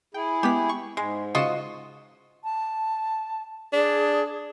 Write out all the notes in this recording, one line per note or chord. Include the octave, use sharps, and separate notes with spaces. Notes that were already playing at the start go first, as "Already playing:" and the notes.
E4 G#4 G5
G#3 B3 G4 B6
C#6
G#2 G#3
C#3 F4 F#4 D#5 D#6 E7
A5
D4 G#4